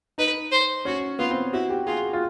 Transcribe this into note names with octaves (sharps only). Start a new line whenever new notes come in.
D#4 B4
C5
C#4 F#4
B3 F4
C4
E4 F#4
G4
F4 G#4
F4